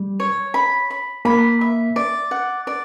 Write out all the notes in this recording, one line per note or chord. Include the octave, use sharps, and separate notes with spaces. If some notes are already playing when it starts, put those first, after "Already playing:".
Already playing: G3
C#5
B5
B5
A#3 B5
E5
D5
F#5
D5